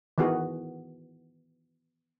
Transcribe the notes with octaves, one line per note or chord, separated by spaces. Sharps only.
D#3 E3 B3 F#4 G#4